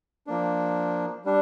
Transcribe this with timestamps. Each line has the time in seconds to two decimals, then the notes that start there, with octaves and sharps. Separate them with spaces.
0.27 F3 A#3 D4
1.25 G3 D4